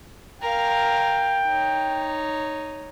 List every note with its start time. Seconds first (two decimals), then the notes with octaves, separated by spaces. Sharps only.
0.42 A#4 F5 G5
1.46 D#4 C#5